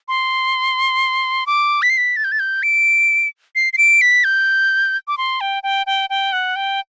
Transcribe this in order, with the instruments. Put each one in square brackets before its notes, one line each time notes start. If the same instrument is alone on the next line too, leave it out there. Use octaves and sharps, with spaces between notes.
[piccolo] C6
D6
B6
C7
B6
A6
G6
A6
G6
D7
C7
C7
D7
B6
G6
D6
C6
G5
G5
G5
G5
F#5
G5